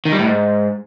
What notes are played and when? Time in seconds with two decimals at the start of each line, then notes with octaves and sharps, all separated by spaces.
0.05 D#3
0.12 G3
0.19 A2
0.26 G#2